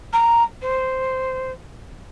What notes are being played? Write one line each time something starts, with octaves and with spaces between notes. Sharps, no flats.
A#5
C5